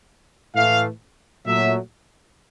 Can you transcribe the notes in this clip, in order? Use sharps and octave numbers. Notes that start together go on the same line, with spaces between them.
A2 E3 A3 F5
A#2 F#3 A3 E5